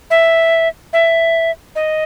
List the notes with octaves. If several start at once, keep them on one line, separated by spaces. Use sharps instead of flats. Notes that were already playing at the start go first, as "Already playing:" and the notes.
E5
E5
D#5